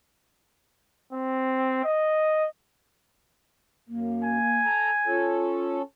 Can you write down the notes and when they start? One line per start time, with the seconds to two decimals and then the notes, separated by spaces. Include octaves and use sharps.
1.13 C4
1.84 D#5
3.88 F#2 A#3
4.23 G#5
4.65 A4 A#5
5.06 C#4 F4 A4